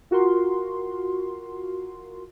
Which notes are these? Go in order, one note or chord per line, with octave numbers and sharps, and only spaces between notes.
F4 F#4 A#4 C6